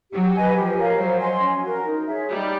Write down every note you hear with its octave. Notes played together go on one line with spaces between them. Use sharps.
F#3 G4
B4 D#5 G#5
F3 G4
A#4 C#5 F5
F#3 C5
D#5 G#5 C6
C#4
F#4 A#4
D#4
G#4 C#5 E5
G3 D#4